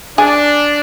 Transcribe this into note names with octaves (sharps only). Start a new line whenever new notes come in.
D4 G#4